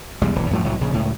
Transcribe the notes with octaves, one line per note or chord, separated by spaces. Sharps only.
B1 E2 G3 G#3
D#1 B1 E3
F#2 A2 F3 F#3
C2 A2 F#3
A#1 C#3
C#2 A2